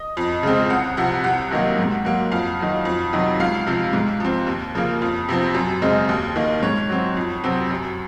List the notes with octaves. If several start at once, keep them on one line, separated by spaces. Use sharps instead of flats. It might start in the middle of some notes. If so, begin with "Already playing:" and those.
Already playing: D#5
F2
C#3 G#3 C4
C2 F#5
C3 F3 F#5
C2 F#5
C3 D#3 F#3 A#3
G#2
F#3 A#3
F2 F5
D#3 F#3
F2
C3 D#3 F#3
C#2 F5
C3 F3
G#2
F3 C4
D#2
C#3 F3 A#3
F2
C3 F3 C4
F#2
C#3 G#3 C4
D#2
D#3 A#3
G#2 C#5
F#3 C4
F2
C3 F#3 C4
F#2